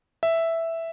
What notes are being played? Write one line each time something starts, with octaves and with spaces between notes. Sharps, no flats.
E5